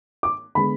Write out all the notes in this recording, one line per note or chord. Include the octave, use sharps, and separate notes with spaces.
D6
D3 G#3 B3 B5